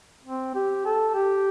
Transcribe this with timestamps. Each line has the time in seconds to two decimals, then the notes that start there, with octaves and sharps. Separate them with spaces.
0.24 C4
0.55 G4
0.85 A4
1.15 G4